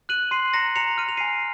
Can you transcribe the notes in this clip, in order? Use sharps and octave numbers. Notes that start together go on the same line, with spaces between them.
F#6 D#7 F#7
C6 C7 D#7
A#5 A#6 C#7
A#5 C#7 F7
F6 D#7
F7
C7 D#7
G#5